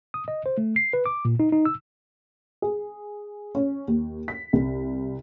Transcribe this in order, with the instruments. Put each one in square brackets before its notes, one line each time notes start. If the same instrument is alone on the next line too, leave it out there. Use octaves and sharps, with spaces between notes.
[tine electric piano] D#6
D#5
C5
A3
C7
B4
D6
A#2
D#4
D#4
E6
[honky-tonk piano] G#4
C#4
D#2
B6
C2